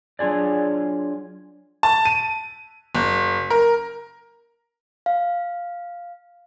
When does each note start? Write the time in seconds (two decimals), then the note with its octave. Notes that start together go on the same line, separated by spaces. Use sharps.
0.19 F#3 D4 F4 G#4 D5
1.83 A5
2.05 D#7
2.95 F#1
3.50 A#4
5.06 F5